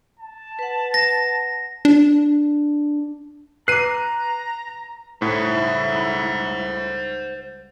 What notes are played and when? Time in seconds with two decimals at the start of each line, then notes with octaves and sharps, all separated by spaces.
0.19 A5
0.59 B4 F#5
0.94 A#6
1.85 D4
3.68 B4 A#5 D6 F#6 C7 D#7
5.22 C#2 A2 G3 E4 C5 F#5